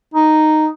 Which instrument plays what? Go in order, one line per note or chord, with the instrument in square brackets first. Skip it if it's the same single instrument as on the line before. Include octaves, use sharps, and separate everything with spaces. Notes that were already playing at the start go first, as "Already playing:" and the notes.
[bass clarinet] D#4